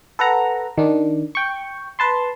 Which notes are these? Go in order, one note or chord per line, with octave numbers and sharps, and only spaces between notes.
A4 B4 F#5 A#5
D#3 D4
G5 C#6
B4 A5 C6